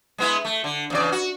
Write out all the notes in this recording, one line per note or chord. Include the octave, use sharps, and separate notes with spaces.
G#3 B3 E4
A3
D3
E2 C#3 D5
F#4